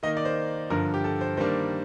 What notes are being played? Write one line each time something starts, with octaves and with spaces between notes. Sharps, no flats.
D#3 A#3 D#4 D#5
D5
C5
G2 D3 F3 A#4
G4
A4
C5
D#3 G3 A#3 D4 C5